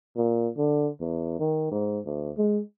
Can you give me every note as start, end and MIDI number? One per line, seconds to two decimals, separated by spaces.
0.17 0.49 46
0.58 0.90 50
1.01 1.38 40
1.40 1.70 51
1.71 1.99 44
2.06 2.31 38
2.38 2.61 56